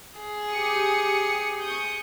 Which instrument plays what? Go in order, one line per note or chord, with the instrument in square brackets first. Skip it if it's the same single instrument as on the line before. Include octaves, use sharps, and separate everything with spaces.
[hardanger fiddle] G#4
[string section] G4 D#6 C#7
C#6 D#6 G6